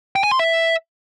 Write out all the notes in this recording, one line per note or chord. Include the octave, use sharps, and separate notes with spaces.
G5
G#5
C6
E5